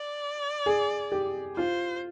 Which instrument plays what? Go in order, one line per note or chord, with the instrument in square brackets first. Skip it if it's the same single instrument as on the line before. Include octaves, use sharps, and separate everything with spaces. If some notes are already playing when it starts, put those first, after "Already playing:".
Already playing: [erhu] D5
[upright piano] G#4
G4
[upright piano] F4 [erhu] C5